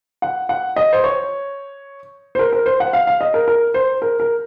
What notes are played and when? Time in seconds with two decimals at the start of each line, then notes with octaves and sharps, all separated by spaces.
0.22 F#5
0.49 F#5
0.76 D#5
0.93 C5
1.04 C#5
2.35 C5
2.39 A#4
2.53 A#4
2.66 C5
2.80 F#5
2.93 F5
3.07 F5
3.21 D#5
3.34 A#4
3.48 A#4
3.74 C5
4.02 A#4
4.20 A#4